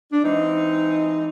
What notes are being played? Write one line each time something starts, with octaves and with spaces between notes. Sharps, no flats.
D4
E3 G#3 C4 D#4